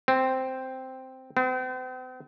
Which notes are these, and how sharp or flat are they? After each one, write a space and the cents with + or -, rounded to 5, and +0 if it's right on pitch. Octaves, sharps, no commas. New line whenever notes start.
C4 -5
C4 -45